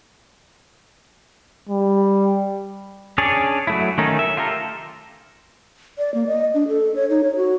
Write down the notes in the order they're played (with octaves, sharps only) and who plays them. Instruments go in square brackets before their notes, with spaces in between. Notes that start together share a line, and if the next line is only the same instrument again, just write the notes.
[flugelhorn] G3
[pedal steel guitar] C#4 D4 G#4 C#5 D5
F#3 A3 E4
D#3 A3 C#4 D#4
E5
F4 G4 A4 A#4
[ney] D5
A#3
D#5
D4
A4
C#5
D#4
C#5
F#4